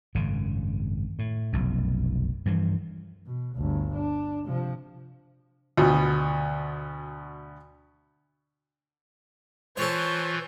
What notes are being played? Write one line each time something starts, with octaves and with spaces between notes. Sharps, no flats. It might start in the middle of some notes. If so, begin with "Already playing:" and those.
G#1 F#2 C#3
A2
F1 B1 F#2
G2 E3 F3
B2
G1 D2
D4
C3 F3
D2 B2
E3 F4 A4 C5 C#5 C#6